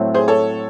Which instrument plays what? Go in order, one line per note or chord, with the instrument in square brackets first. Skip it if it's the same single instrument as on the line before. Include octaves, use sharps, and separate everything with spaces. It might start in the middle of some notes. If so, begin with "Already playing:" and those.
Already playing: [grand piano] A2 F#3 A3 C4
[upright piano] G#4 C5
A4 C#5